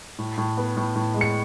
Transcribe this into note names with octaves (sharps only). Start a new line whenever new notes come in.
A2
A2
B3
A2
A2
G#3
C#7